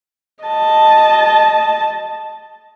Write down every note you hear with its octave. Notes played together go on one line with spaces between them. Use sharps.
D#5 A5